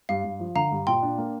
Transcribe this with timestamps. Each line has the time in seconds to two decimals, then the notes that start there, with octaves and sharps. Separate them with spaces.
0.09 G2 F5
0.24 G2
0.40 F3
0.56 D3 F5 A#5
0.71 G2
0.87 A#2 G5 C6
1.02 D4
1.18 A#3